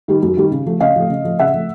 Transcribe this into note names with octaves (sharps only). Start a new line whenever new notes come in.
D#3 G3
F#2
D#3 G3
C#3
F3 A3
C#3 D#5 F5
F3 A3
C#3
F3 A3
C#3 E5 F#5
F3 A3